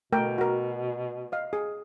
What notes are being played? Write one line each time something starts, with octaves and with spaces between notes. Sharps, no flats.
B2 A3 A#4 G5
F#4 A#4
D#5 F5
G#4